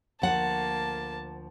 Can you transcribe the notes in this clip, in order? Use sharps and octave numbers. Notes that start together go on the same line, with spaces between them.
D2 F3 A#3 F#5 A5